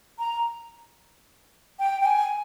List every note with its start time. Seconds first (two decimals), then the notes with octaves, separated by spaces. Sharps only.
0.19 A#5
1.79 G5
2.01 G5
2.06 G#5